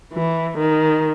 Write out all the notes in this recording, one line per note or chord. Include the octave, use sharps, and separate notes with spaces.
E3
D#3